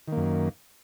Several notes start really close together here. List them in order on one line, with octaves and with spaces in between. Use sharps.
D#3 A#3 F#2